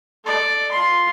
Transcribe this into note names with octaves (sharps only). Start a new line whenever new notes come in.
A4 D5
F4 C6